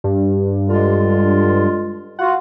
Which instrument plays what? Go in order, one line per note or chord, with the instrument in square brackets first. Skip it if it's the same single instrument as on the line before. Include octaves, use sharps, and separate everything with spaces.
[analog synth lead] G2
[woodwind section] D3 G#3 F4
[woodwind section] F4 F#4 [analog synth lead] F#5